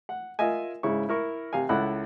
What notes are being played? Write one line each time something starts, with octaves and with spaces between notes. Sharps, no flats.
F#5
F4 A#4 D#5 E5 G#5
G#2 C#3 E4 C#6
E4 A#4 C#6
C3 F5 G#5
C#2 E4 A4 F#5 B5 F#6